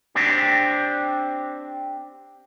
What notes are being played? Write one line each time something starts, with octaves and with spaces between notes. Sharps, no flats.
C4 D4 G4